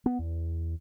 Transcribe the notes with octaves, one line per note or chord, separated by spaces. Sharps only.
B3
E2